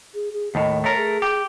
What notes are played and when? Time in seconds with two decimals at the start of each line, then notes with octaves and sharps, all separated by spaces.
0.14 G#4
0.33 G#4
0.55 D#2 A2 D#5
0.84 A3 A#4 C#5
0.97 G#4
1.22 G4